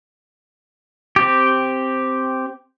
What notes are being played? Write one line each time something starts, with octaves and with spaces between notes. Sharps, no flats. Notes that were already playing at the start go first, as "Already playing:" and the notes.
C4 G4